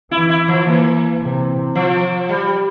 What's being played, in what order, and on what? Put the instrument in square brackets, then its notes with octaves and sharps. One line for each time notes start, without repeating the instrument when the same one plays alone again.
[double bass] E3 [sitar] E4
[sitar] E4
F3
[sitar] E3 [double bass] A#3
[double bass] C3
[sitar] F3
G3